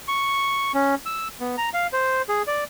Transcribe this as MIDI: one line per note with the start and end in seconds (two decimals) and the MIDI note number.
0.08 0.72 85
0.74 0.95 61
1.06 1.28 88
1.40 1.56 59
1.58 1.69 82
1.74 1.87 77
1.93 2.22 72
2.29 2.42 68
2.47 2.64 74